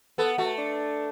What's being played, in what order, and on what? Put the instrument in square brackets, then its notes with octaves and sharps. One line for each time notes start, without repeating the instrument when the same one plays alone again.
[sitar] B3 [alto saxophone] A4
[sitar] A3 [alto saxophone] F#4
[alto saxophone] D4